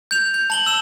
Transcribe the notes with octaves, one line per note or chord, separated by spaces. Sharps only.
G6 F7
G6
A5 F#7 G7
E6 E7